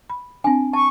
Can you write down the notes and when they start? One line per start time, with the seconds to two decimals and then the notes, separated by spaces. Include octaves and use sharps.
0.10 B5
0.44 C4 D4 G#5
0.73 A5 C#6